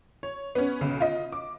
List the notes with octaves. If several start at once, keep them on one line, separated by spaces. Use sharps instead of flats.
C#5
B3 C#4
B1 C#3
F4 D#5
D6